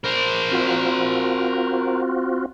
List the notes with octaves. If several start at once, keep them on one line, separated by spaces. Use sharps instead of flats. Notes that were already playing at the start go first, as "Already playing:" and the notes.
A#4 C5
C4 F4 F#4